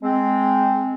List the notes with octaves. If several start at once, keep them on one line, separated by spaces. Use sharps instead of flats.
G#3 C4